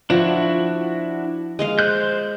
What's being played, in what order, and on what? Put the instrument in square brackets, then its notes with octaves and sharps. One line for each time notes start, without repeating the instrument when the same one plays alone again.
[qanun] F3 [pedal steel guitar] D4 E4 F#4
[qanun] G#3 D#5 F5
[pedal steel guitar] C5 F#6 G6